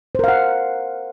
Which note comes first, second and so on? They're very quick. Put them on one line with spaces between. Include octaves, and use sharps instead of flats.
C5 A#4 F5 F#5